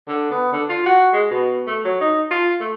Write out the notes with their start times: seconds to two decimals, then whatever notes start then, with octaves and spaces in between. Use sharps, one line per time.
0.08 D3
0.31 B3
0.53 D3
0.69 F4
0.86 F#4
1.13 G#3
1.30 B2
1.67 A3
1.84 F#3
2.01 D#4
2.31 F4
2.60 A3